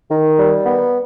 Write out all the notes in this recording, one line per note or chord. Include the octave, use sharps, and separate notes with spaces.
D#3
G3
B3